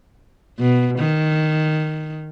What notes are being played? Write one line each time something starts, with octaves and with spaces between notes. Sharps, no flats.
B2
D#3